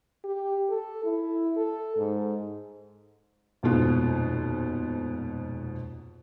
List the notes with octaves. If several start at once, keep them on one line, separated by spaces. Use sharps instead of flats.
G4
A4
E4
A4
G#2
D#1 F2 G#2 B2 F4